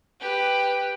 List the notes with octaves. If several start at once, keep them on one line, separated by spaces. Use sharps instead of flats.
G4 B4